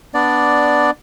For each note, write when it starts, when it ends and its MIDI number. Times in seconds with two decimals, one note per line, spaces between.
0.14 0.90 59
0.14 0.90 62
0.14 0.90 74